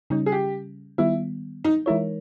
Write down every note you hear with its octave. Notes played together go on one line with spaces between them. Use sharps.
C#3 G3 C#4 D#4
G#4
G4
D#3 G3 B3 E4
D#4
E3 G#3 D#4 E4 A#4 C#5